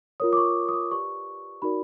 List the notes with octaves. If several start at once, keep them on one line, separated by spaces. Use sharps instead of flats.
F4 A#4 C#5 D#6
D6
C#6
D#6
D6
G4 B4 D5 C#6
D#4 F#4 A#4 D5 B5